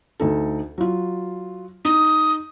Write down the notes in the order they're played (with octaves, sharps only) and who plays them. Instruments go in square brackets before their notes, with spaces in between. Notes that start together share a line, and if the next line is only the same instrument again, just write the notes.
[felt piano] D2 D#4 A4
F#3 F4
[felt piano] D#4 [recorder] D#6